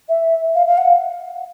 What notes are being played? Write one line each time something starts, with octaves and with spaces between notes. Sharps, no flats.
E5
F5
F5
F#5